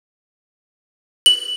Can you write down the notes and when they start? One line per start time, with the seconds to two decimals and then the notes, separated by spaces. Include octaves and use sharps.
1.26 F#7